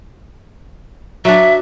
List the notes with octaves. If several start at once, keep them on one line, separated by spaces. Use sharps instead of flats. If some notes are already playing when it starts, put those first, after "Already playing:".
F#3 D4 E5